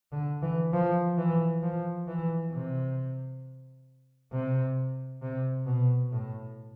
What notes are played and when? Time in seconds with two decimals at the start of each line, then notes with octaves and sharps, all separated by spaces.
0.12 D3
0.42 E3
0.73 F3
1.18 E3
1.62 F3
2.07 E3
2.52 C3
4.32 C3
5.22 C3
5.66 B2
6.12 A2